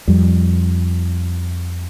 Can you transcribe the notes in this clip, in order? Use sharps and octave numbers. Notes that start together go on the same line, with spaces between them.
F2 G3